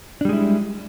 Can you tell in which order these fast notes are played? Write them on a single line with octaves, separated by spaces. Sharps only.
D4 G3 G#3 E4